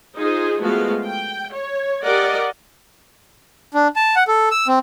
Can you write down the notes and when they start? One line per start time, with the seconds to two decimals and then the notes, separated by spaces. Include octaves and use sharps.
0.16 D#4 F4 G#4 C5
0.60 F3 G#3 A3 B3 F#4 F5
1.04 G5
1.53 C#5
2.04 G4 A#4 D5 D#5 F#5
3.74 D4
3.96 A5
4.16 F#5
4.28 A4
4.51 E6
4.68 C4